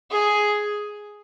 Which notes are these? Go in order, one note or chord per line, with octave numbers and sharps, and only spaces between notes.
G#4